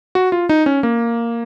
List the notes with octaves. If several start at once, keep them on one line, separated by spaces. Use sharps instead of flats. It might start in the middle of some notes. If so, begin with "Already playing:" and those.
F#4
F4
D#4
C#4
A#3